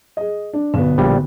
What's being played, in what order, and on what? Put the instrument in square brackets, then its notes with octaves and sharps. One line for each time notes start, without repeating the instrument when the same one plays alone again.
[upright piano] G#4 D#5
D4
[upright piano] B1 B3 [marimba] D3
[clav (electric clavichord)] A#1 G3